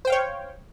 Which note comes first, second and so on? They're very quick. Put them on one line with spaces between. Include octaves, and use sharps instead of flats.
C5 G5 F5 C#5